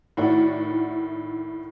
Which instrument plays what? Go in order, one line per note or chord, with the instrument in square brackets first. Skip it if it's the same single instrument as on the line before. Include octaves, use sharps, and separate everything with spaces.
[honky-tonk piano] A2 D#3 E4 F#4 D5 F#5